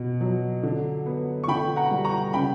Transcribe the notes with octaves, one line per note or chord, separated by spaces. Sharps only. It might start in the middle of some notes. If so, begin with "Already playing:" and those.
Already playing: B2
F#3
D3
B3
C#6
D3 G5 B5
F#5 A#5
G3
A#5 C#6
C#3 G5 B5